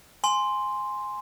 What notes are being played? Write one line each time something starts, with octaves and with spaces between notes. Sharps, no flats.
G#5 C6